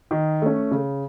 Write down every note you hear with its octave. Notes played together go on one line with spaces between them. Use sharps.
D#3
A3 C#4
C#3